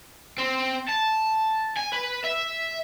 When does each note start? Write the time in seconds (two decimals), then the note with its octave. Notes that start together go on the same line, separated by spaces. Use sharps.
0.38 C4
0.88 A5
1.76 G#5
1.92 B4
2.24 E5